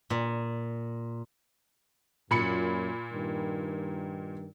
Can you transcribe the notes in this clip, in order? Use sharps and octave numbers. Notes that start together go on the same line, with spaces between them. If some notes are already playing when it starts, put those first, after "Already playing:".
A#2
F#2 A#2 B5 C#7
G2 D#3